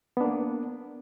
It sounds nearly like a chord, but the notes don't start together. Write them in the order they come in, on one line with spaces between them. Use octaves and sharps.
B3 D4 A#3